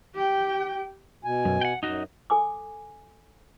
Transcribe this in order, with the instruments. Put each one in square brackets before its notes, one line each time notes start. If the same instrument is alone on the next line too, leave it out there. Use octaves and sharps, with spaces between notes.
[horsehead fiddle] G4 G5
[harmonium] B2 G#5
[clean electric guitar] B1 F#2
F#5 G5
[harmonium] F#2 [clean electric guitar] D#4 F#4
[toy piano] A4 G#5 D6